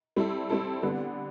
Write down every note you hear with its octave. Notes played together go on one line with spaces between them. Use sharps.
G3 C4 E4 A4
G3 C4 E4 A4
D3 G3 B3